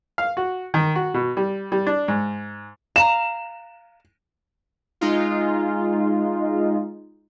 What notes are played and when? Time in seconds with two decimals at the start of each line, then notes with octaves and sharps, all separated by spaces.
0.18 F5
0.37 F#4
0.74 D#3
0.95 F#4
1.14 B2
1.37 G3
1.72 G3
1.87 D4
2.08 G#2
2.96 F5 A#5 E7
5.01 G#3 D#4 F4